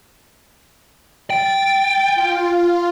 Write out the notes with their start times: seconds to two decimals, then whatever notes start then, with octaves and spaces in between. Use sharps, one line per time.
1.30 G5 A6
2.15 F4